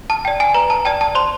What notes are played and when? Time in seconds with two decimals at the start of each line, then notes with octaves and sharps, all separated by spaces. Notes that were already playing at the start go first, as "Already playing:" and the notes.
0.10 A5
0.25 G5
0.28 D5
0.40 G#5
0.54 B4 A#5
0.70 A5
0.85 D5 G5 A5
1.01 A5
1.15 C5 C6